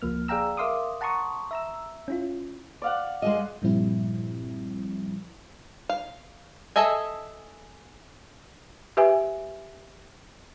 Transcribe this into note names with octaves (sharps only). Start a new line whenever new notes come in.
C#2 F3 A#3 F6
G#4 D5 F5 G5 A#5 E6
A#4 E5 F5 C6 D6 D#6
F#5 A5 A#5 C6 C#6 D#6
E5 A#5 E6
C#4 E4 F4
D5 F5 F#5
G#3 G#4 D#5
G2 A#2 F3 G3 C4 E4
F5
G#4 A4 D#5 E5 G#5
G4 B4 E5 G#5